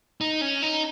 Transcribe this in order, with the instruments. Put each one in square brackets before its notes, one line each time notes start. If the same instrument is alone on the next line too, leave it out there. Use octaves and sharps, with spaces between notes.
[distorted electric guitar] D#4
C#4
D#4